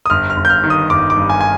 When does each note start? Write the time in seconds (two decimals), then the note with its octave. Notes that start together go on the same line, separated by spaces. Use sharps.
0.06 D#6
0.10 G1 F6
0.30 F6
0.37 G1
0.45 G6
0.50 F6
0.64 D#3
0.70 D#6
0.90 G1 D6
1.10 D6
1.16 G2
1.29 G#5
1.41 G#5